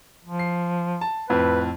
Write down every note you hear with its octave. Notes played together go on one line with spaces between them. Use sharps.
F3
C7
A5
F2 A2 B4